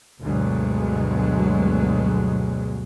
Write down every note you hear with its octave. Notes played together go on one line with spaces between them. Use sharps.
D2 G2 B2 F#3 G#3